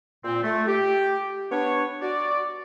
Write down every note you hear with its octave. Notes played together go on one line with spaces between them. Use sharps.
A#2 C4
A3
G4
B3 D4 C#5
F#4 D5